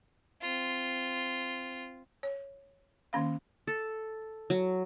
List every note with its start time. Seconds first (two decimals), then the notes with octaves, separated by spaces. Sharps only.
0.41 C4 F4
2.23 C#5
3.13 D#3 A#3 C#4 F5
3.67 A4
4.50 F#3